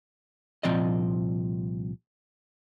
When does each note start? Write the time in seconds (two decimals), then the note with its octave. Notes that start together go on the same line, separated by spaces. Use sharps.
0.63 C2 A#2 F3 C4 D5 D#5